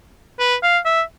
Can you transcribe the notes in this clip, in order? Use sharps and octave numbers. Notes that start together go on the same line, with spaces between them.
B4
F5
E5